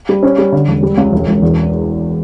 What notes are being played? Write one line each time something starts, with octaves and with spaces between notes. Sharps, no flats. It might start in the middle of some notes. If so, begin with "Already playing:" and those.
G3
C#4
G3
D3
E1
G3
C#2
E1
E1
E2